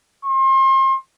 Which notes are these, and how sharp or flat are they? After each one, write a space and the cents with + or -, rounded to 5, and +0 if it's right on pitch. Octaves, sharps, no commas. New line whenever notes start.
C6 +35